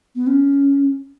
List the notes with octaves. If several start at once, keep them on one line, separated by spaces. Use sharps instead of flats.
B3
C#4